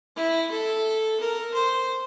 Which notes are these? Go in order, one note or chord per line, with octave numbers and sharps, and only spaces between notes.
E4
A4
A#4
C5